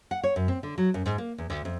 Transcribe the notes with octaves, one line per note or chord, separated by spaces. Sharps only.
F#5
C#5
F#2
C4
D3
F#3
F#2
G#2
A#3
E2
D2
F2